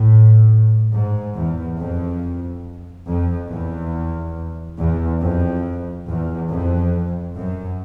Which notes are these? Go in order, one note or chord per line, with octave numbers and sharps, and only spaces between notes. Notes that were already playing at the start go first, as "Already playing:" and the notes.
Already playing: A2
G#2
E2
F2
F2
E2
E2
F2
E2
F2
F#2